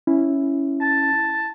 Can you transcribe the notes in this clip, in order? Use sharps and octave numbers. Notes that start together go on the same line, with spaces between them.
C#4 E4
A5